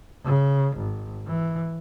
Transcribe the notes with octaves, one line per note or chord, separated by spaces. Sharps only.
C#3
G#1
E3